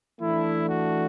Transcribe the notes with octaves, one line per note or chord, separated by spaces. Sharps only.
E3 A3 D4 E4
F#4